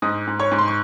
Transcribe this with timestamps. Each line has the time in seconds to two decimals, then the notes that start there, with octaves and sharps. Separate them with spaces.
0.02 G#2 D#5 D#6
0.27 G#2
0.40 C#5 C#6
0.51 G#2
0.59 C6
0.68 C#6